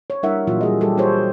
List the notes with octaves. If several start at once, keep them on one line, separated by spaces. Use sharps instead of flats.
C#5
G3 D4 E4 A#4 E5 F#5
A#2 E3 F#3 F4
G3 G#4 D#5
G3 G4 A4
F4 F#4 G#4 A4 C5 C#5